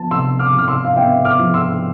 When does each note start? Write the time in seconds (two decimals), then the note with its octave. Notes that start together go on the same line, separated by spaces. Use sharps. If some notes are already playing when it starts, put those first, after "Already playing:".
Already playing: F3 B3 A5
0.11 C3 C6 E6
0.39 D6 F6
0.54 C3 F6
0.68 C6 E6
0.85 F5
0.96 B3 E5 G5
1.25 D6 F6
1.39 F3
1.54 C6 E6